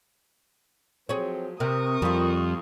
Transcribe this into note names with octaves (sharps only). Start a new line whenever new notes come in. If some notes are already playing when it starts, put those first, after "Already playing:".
F3 F#3 C4 G#4 C#5
C3 A#4 C#6 D#6
F2 G3 F4